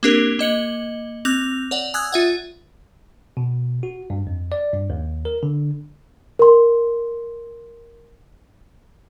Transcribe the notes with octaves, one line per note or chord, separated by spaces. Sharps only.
A#3 C4 D4 G4 A#4
A#3 D#5 C#7 F#7
C4 D6 F#6 G6 F7
C#5 D5 F#5
G#5 D#6 E6 F#6 G#6
F4 E5 F#5
B2
F#4
G2
F2
D5
G2
D#2
A#4
D3
A#4 C6